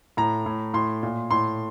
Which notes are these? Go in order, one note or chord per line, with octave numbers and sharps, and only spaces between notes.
A2 A#5
A2
A2 C6
A#2
A2 C6